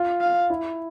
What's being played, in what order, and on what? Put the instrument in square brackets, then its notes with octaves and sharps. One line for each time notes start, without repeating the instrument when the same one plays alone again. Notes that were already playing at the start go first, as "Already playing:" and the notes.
Already playing: [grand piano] F4
[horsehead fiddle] F5
[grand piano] E4